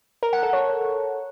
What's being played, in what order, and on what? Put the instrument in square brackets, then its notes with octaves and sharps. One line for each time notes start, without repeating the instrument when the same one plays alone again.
[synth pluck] A#4
F#5
A4
C#5